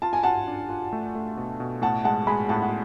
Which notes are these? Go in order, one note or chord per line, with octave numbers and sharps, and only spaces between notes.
F4 A5
G#5
F4 F#5 A5
D4
F4
A3
A3
B2
B2
A2 F#5 A5
G#3 F#5 A5
G#3 G#5 B5
A2 F#5 A5
F#5